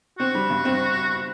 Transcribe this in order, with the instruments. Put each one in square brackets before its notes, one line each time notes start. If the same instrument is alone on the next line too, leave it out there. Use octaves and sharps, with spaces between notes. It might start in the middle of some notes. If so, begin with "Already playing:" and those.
[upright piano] C4 [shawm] F#4
[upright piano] G3
G2
C4